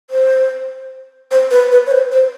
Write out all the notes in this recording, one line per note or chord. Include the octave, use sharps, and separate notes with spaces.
C5
C5
B4
B4
C#5
C5
C5